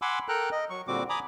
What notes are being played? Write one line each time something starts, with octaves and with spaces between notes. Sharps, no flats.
F#5 G#5 B5 C6 D6 E6
A4 A#4 G5 A#5 F#6
D#5
F#3 C#6
A#2 D3 G3 C4 F#4 D6
G#5 A#5 B5 D6 D#6